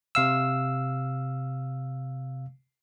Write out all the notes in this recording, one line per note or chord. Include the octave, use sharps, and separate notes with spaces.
C3 F5 E6